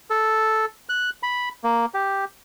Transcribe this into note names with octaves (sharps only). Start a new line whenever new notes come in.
A4
F#6
B5
A#3
G4